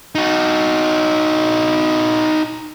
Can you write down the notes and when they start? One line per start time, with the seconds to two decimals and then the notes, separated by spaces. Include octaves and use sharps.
0.15 D#4 F#4